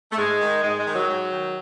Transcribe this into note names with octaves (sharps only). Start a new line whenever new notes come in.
A3
G#2 G#3
D#3
G#2 G#3
G#3
D#3
F#3
G#2
D#3